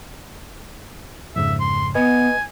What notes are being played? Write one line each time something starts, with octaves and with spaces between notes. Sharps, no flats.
F2 G#2 C#3 E5
C6
B3 B4 D#5 G#5